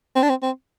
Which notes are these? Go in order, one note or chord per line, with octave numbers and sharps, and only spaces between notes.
C4
D4
C4
C4